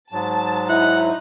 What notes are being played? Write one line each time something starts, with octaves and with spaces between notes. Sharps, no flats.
G#2 F#3 A5
D#4 E4 F#5